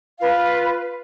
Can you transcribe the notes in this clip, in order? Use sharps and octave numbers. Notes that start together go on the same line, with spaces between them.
F4 B4 F5